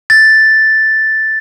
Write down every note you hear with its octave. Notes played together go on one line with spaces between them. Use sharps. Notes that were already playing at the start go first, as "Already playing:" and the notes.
A6